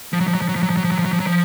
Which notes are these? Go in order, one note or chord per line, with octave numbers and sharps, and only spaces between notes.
F3
F#3
F3
F#3
F3
F#3
F3
F#3
F3
F#3
F3
F#3
F3
F#3
F3
F#3
F3